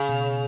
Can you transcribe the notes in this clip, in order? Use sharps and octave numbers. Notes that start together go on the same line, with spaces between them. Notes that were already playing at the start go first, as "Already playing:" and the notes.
Already playing: C#3
B2